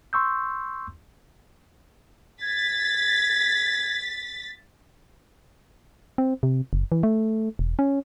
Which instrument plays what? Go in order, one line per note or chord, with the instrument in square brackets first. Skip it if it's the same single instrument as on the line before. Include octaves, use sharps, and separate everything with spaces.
[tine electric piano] C6 C#6 E6 G6
[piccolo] G#6 [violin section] A6 B6
[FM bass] C4
C3
F#1
E3
A3
E1
C#4